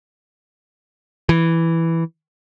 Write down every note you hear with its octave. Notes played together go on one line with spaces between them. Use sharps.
E3